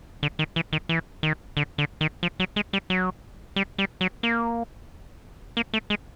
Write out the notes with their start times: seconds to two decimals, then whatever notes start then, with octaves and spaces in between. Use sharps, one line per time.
0.23 D3
0.39 D#3
0.56 E3
0.73 D#3
0.89 E3
1.23 D#3
1.57 D3
1.78 D3
2.01 D#3
2.23 F3
2.40 F#3
2.56 G#3
2.73 G3
2.90 F#3
3.56 G3
3.79 G3
4.01 F#3
4.23 A#3
5.57 A#3
5.74 A3
5.90 G#3